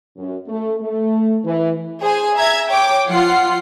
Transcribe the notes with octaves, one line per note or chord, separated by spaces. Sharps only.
F#2
A3
A3
E3
G#4 C5 G#5
E5 A#5 G#6
C#5 G5 D6
F3 F4 F#5 C7